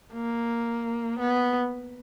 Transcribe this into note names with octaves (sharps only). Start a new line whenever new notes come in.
A#3
B3